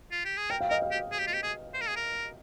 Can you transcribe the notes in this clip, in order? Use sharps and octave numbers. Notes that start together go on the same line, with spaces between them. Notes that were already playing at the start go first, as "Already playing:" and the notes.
F4
G4
G#4
A#4 G5
F5
A#4 D#5
F5
G4
G#4
G4
F4
G4
G#4
C5
A#4
G#4
A#4